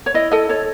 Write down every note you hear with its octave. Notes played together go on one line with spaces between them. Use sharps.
C#5
E4 D#5
A4 D#5
A4 C#5